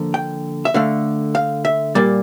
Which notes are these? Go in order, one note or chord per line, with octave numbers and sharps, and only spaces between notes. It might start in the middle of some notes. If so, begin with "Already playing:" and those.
Already playing: D3 F3 A#3
G5
E5
D3 A3 F5
F5
E5
A#2 G3 A#3 D5